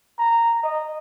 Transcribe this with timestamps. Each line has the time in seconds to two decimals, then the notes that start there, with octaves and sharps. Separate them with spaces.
0.18 A#5
0.63 D#5